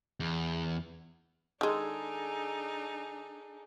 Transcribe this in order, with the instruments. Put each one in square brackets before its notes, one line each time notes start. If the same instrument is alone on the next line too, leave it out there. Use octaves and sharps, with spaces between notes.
[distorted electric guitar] E2
[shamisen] D#3 G#3 [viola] D4 D#4 [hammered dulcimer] G#4 A4